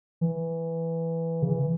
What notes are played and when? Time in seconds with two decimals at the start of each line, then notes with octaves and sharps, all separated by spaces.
0.21 E3
1.42 C#3
1.49 E3